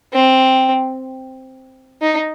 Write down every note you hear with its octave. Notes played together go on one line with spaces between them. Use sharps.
C4
D#4